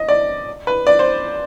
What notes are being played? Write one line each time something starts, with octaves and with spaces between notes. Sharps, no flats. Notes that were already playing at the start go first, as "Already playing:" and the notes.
Already playing: D#5
D5
B4
D5
C5